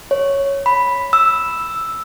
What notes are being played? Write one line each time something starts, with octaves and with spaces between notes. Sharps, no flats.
C#5
B5
E6